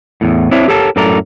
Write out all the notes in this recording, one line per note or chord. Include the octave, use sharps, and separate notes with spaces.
E2 A2
C4 D4 E4 C5 C#5 E5
G4 A4 A#4 C#5 A5
F#2 A2 A4 A#4 D5 A#5